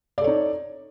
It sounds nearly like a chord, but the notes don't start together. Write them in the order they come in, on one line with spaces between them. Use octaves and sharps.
D5 A4 C#5 D#4